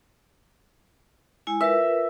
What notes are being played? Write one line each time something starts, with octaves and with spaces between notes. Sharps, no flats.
G#3 E4 G#5
F4 A#4 B4 E5